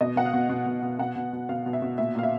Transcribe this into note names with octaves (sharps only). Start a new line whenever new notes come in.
B2 D#5
B2 F#5
F5
B2
B2
B2
B2
B2 F#5
B2
B2
B2 F5
B2
E5
B2
A#2 E5
A#2 F5
E5